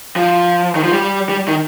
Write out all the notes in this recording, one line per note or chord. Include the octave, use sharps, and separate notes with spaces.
F3
D#3
F3
G3
G3
D#3